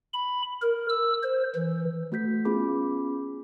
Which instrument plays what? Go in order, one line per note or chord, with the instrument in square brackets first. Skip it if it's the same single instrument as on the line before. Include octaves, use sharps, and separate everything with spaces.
[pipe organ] B5
A#4
E6
C5
E3
[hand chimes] A3 F#4 G6 B6
B3 C#4 F4 G#4 B5 D6